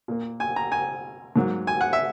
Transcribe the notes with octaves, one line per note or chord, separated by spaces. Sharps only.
A#2 A#3
G#5
A#5
G#5
G#2 F#3 A#3
G#5
F#5
E5